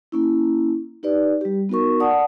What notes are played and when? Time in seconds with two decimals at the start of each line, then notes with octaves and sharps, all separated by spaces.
0.12 A#3 C#4 E4
1.03 D#4 G4 B4 D5
1.41 G3 G4
1.69 B3 D#4 F#4 A#4 C#6
2.00 D5 F#5 A5 D#6